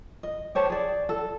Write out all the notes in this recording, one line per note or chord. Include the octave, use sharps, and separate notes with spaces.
D#5
G4 C5 C#5 A5
G#4 D5
A4